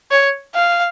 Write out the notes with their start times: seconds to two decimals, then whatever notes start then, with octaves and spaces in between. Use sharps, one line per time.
0.11 C#5
0.55 F5